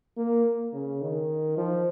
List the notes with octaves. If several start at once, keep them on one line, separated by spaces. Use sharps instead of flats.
A#3
C#3
D#3
F3